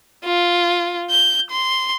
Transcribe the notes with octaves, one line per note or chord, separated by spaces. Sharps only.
F4
G6
C6